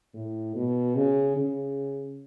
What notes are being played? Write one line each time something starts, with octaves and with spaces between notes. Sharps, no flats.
A2
B2
C#3
C#3